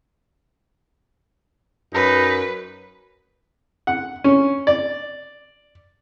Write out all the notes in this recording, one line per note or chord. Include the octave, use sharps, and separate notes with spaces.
F#2 D#4 B4
F#5
C#4
D5